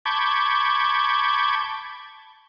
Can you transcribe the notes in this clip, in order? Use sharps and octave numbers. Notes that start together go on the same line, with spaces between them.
A5 B5 C#6 D6 G6 G#6